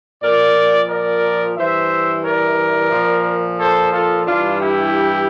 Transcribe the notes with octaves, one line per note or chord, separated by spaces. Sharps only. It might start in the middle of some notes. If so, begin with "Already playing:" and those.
A#2 F3 A#4 D5
A#4 D5
G2 E3 C5 E5
A#4 D5
A#2 F3
A4 C5
F4 A4
G2 E3 D4 F4
E4 G4